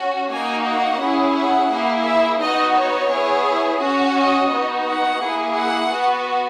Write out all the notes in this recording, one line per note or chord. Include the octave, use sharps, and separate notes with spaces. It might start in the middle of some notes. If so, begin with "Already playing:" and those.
Already playing: C#4 F#4
A#3 D#4 F#4 G#5
F#5
C#4 E4 G#4
F#5
A#3 E4 G#4
E5
B3 D#4 F#4 D#5
C#5
B3 E4 G#4
C#4 F#4
D#5
B3 D#4 F#4
F#5
A#3 E4 G#4
F#5
B3 F#4